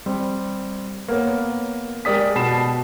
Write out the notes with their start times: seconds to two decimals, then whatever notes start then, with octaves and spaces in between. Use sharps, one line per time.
0.06 G3 C4
1.08 A#3 B3 C#5
2.05 G#3 G4 A#4 D5 D#6 B6
2.35 B2 A5 B5 C7 E7